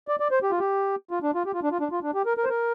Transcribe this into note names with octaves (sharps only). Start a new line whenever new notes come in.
D5
D5
C5
G4
F4
G4
F4
D4
F4
G4
F4
D4
F4
D4
F4
D4
G4
A#4
A#4
C5
A#4